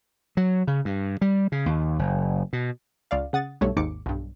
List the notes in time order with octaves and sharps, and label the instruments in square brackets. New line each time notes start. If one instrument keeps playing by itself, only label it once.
[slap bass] F#3
C#3
G2
G3
C#3
D#2
F#1
B2
[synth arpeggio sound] C#2 D5 F5
C#3 F#5 D#6 A6
B1 G2 A3 C#5
G#1 D#2 G#2 D6 C#7
B1 G2